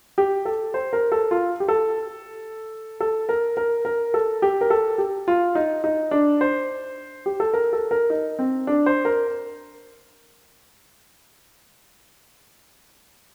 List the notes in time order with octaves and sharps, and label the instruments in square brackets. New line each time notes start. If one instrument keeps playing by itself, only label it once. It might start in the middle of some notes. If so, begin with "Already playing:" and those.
[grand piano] G4
A4
C5
A#4
A4
F4
G4
A4
A4
A#4
A#4
A#4
A4
G4
A#4
A4
G4
F4
D#4
D#4
D4
C5
G4
A4
A#4
A4
A#4
D#4
C4
D4
C5
A#4